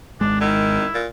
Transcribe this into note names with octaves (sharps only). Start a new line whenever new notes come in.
G#1 G#3 D4
D#3 E4
A#2